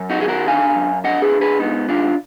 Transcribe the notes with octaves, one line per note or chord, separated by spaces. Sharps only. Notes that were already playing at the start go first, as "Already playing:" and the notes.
Already playing: F#2
D#4 F#4
D#3 G#4
F#4 A#4
D3 F5 G#5
F#2
D3 D#5 F#5
G#4 B4
D3
G#4 B4
G#2 B3 D#4
D#3 D4 F4